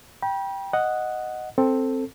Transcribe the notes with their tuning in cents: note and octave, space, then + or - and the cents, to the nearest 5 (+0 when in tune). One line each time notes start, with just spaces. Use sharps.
G5 +0 B5 -40
D#5 +0 F#5 +0
C4 +5 A4 +10